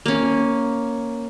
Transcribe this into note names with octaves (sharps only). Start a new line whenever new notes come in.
A#3 C#4